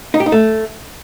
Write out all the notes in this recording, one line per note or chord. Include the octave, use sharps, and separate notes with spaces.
D#4
G4
D#4
A3